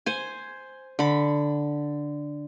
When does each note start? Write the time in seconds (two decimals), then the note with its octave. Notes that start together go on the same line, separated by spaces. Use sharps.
0.06 C5 G#5
0.99 D3 B5